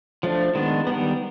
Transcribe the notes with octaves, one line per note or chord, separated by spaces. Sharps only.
F3 A3 D4
D#3 G#3 B3 D4
D#3 G3 B3